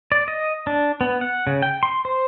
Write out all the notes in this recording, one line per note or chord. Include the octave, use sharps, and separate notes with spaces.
D5
D#5
D4
B3
F#5
C#3
G5
C6
C5